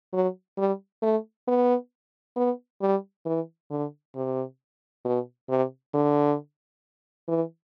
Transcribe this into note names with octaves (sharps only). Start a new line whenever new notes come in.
F#3
G3
A3
B3
B3
G3
E3
D3
C3
B2
C3
D3
E3